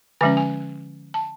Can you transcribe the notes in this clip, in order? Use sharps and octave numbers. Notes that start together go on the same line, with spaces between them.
D3 F3 G#3 C#4 G#5
G#5
A5